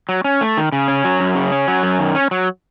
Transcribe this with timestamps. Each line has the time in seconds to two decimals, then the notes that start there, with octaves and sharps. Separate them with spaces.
0.09 F#3
0.24 C#4
0.41 A3
0.57 D#3
0.72 C#3
0.88 C#4
1.05 F#3
1.20 F#2
1.35 C#3
1.52 C#4
1.68 F#3
1.83 F#2
2.00 D#3
2.15 C#4
2.31 F#3